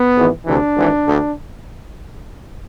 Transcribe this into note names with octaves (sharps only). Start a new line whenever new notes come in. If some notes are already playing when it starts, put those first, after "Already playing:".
Already playing: B3
G#1 G#2 E3
D2 C3 E3 D4
G#1 G#2 E3
D2 D3